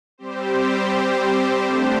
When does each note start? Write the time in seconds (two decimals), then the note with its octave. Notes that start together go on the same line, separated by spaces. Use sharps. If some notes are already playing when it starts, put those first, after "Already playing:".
0.18 G3 C4 G4 C5
1.65 D3 A3 D4 G4 C5